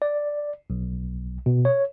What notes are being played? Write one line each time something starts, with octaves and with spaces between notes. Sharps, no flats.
D5
B1
B2
C#5